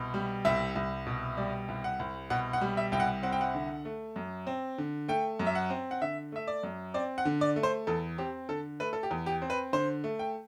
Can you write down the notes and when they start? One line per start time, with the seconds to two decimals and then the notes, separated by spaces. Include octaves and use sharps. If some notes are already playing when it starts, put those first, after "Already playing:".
Already playing: C2 B2
0.14 G3
0.45 C2 E5
0.76 C2
1.07 B2
1.37 G3 D5
1.68 C2
1.84 F#5
2.00 C2
2.30 B2 F#5
2.53 F#5
2.61 G3
2.77 E5
2.92 C2 G5
3.00 F#5
3.23 C4 F#5
3.32 G5
3.41 F#5
3.55 D3
3.85 A3
4.16 F#2
4.47 C4
4.78 D3
5.08 A3 G5
5.39 F#2
5.47 E5
5.55 F#5
5.70 C4
5.91 F#5
6.02 D3 E5
6.32 A3 E5
6.47 D5
6.63 F#2
6.94 C4 D5
7.18 F#5
7.25 D3
7.41 D5
7.56 A3
7.63 C5
7.87 E2 A4
8.18 C4 G4
8.49 D3 A4
8.80 A3 B4
8.93 A4
9.03 G4
9.11 E2
9.26 G4
9.42 C4
9.50 B4
9.73 D3 C5
10.04 A3
10.19 G5